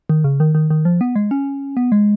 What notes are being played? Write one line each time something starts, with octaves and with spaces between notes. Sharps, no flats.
D#3
C#3
D#3
D#3
D#3
F3
B3
G#3
C#4
B3
G#3